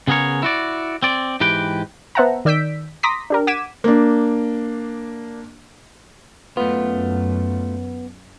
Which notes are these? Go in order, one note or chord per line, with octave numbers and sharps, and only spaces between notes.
C#3 B3 G#4 A#4 C#5
E4 F#4 D5
C4 D5
G#2 E3 G4 B4 G5
B3 C5 E5 F#5 A5 A#5
D#3 D5 E6 G6 B6 D7
A#5 C6 D6 D#6 A#6 B6
D4 G4 A#4
F#5 D6 G#6 B6 D#7 E7
A#3 D4
F#2 A3 B3 F4